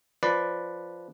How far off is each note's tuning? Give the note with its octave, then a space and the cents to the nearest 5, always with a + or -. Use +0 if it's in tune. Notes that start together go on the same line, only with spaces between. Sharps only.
F3 +0 B4 +0 D5 +0